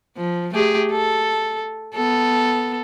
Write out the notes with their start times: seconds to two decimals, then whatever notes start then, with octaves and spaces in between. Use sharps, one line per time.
0.17 F3
0.54 A3 G4 G#4
0.91 A4
1.95 B3 A4